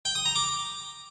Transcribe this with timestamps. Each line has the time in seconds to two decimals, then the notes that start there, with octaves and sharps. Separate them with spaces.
0.05 G5
0.15 D#6
0.25 A#5
0.36 D6